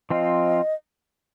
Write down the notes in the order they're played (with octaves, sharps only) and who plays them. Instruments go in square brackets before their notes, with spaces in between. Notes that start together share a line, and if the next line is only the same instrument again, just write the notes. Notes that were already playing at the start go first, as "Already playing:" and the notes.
[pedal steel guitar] F3 C4 F4 [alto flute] D#5